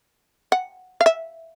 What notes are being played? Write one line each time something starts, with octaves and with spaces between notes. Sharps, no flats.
F#5
F5
E5